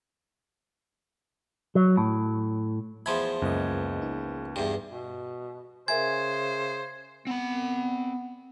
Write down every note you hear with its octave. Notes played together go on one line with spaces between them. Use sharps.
F#3
A2
E2 F3 E5 A5 B5 C6 G#6
C#2 F#2 A#3 B4 D#5
D#4
E2 G2
B2
C#3 A#4 C5 E5 G#5 G#6
B3 C4 B5